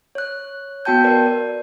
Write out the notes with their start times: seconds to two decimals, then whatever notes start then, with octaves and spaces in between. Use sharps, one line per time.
0.15 C#5 F#6
0.85 B3 F#4 G5 A5 G6
1.04 A#4 B4 D5
1.26 D5